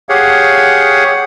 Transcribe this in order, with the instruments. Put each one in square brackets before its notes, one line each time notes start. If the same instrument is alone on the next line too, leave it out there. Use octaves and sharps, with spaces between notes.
[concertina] G4 G#4 C#5 F5 F#5